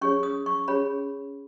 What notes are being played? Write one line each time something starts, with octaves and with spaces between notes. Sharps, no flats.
C#4 G#4 C#5 C#6
D#6
C#6
C#4 G#4 C#5 B5